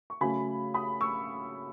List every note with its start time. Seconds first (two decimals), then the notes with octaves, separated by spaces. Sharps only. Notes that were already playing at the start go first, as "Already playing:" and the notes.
0.10 C#6
0.21 C#3 F#3 A3 C#4 G#5 B5
0.74 B5 D#6
1.01 C#6 E6